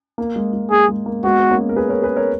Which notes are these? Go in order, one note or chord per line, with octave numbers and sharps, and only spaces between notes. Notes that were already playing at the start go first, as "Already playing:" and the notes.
A#3
G#3
G#3
A#3 G#4
G#3
A#3
G#3 B3 F#4
B3
A#3 C#4
A#4
G#4 B4
A#4 C#5
G#4 B4
A#4 C#5